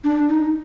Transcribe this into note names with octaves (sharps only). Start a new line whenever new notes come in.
D4
D#4